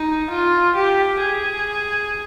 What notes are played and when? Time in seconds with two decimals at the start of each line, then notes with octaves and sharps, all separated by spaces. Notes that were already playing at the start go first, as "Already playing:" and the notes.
Already playing: D#4
0.30 F4
0.75 G4
1.20 G#4